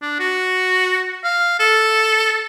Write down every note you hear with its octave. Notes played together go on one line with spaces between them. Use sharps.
D4
F#4
F5
A4